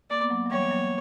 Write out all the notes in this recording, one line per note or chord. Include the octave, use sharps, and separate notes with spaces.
A#3 D5
B3
F#3 A#3
F#3
E3 G3 C#5
B3
F#3 A#3